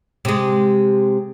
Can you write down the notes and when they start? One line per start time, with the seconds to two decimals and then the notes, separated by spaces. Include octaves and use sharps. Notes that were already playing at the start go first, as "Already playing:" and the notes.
0.25 C3 G#3